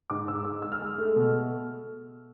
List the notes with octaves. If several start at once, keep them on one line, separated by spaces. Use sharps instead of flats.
G#2 D6
G#2 E6
G#3 E6
G#3 E6
F6
G#3
A3
B2